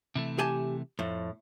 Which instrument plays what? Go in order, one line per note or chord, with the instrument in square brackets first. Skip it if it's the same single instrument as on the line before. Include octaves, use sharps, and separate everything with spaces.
[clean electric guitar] C3 E3 A3
[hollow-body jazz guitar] G4 G#5 A5
[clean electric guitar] F2 [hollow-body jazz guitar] A2